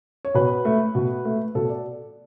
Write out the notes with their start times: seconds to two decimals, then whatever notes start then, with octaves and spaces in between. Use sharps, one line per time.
0.25 C#5
0.34 B2 B4
0.65 A3
0.95 B2
1.25 A3
1.55 B2 A4
1.69 D5